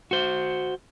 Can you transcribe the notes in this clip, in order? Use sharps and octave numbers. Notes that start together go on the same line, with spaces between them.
F#4 C5